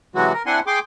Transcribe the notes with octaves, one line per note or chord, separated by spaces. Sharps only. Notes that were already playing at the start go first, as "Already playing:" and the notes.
C3 E3 F#3 G#3 F#4
A#4
C4 D4 E4 F#5 G#5 C6
G#4 G5 C6 D6